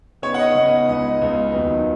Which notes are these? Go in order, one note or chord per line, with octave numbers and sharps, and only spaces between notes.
C#3 B3 D#4 C#5
F#5
D#5
C#3 B3 D#4
C#2 C#3 B3 D#4 D#5
C#2 C#3 B3 D#4
D#2 D#3 F#3 B3 D#4